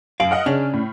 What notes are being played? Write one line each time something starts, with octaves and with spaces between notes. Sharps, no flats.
F#2 F5 D7 F#7
D#5 F#5 F6
C#3 C#4 D4
A2